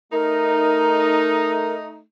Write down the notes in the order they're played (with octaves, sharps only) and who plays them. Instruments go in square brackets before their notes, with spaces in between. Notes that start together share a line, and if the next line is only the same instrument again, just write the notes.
[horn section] A3 D#4 [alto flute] A#4